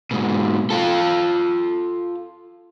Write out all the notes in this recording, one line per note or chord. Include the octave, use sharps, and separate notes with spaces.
G#2 B2
F4 A4